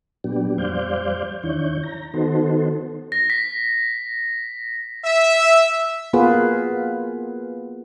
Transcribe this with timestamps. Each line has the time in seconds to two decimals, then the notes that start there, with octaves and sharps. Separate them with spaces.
0.24 A#2 F#3 B3 D4 G4
0.58 F2 G3 C5 D5 F5 G6
1.43 E2 D#3 D4 E4 C#5 G6
1.83 A#5
2.14 D#3 B3 D#4 F#4 A4 C5
3.12 A#6
3.30 B6
5.05 E5
6.13 A#3 B3 F4 G#4 B4